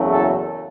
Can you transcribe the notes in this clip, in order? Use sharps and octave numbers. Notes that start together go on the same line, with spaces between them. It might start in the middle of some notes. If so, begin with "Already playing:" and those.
Already playing: F#1 E2 C#3 F#3 A3
A4